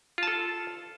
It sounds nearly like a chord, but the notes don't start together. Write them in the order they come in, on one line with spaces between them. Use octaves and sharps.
F4 A5 A4